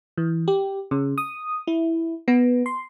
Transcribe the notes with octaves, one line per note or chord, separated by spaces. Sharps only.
E3
G4
C#3
D#6
E4
B3
C6